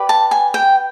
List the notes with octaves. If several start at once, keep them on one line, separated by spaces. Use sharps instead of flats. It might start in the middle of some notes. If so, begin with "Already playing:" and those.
Already playing: G4 B4 D5
A5
G#5
G5